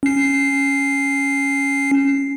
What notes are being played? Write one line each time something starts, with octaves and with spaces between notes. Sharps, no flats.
C#4 C7